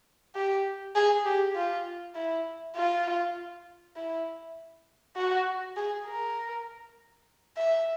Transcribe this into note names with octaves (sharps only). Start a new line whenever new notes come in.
G4
G#4
G4
F4
E4
F4
E4
F#4
G#4
A#4
E5